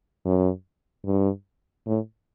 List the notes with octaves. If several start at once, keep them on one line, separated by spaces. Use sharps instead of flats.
F#2
G2
A2